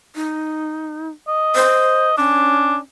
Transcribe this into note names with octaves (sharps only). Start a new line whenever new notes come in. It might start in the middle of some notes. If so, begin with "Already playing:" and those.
D#4
D#5
C5
C#4 D4